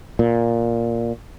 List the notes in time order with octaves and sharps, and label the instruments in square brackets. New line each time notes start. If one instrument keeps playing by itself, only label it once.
[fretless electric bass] A#2